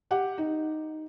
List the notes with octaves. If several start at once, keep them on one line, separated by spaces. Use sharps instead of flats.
G4 F#5
D#4